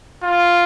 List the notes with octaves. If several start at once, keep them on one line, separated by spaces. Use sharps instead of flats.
F4